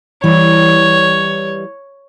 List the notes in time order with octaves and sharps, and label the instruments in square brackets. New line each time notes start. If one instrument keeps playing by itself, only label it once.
[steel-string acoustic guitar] E3 G3 [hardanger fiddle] C#5